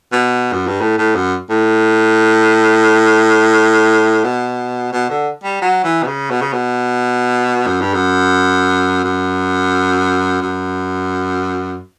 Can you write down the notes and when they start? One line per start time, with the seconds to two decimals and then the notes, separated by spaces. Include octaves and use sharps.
0.12 B2
0.53 F#2
0.67 G2
0.81 A2
0.98 A2
1.15 F#2
1.50 A2
4.24 B2
4.92 B2
5.10 D3
5.44 G3
5.61 F#3
5.84 E3
6.03 B2
6.07 C#3
6.30 B2
6.41 C#3
6.53 B2
7.67 F#2
7.81 G2
7.94 F#2
9.04 F#2
10.42 F#2